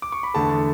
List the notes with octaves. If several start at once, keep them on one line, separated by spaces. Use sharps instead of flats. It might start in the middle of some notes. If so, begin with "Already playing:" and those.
D6
C#6
B5
E2 D3 A3 A5